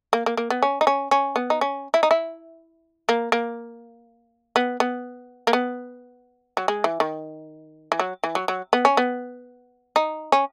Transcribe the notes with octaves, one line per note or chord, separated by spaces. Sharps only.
A#3
A#3
A#3
B3
C#4
D#4
C#4
C#4
B3
D#4
C#4
E4
D#4
E4
A#3
A#3
B3
B3
A#3
B3
F#3
G#3
E3
D#3
E3
F#3
E3
F#3
F#3
B3
C#4
B3
D#4
C#4